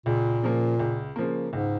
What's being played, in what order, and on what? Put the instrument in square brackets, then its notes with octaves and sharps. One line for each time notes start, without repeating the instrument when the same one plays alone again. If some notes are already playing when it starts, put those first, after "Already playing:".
[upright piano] C#2 [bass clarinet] A#2
[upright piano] C#3 F3 A#3
C#2
C#3 F3 A#3
[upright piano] C#2 [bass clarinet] G#2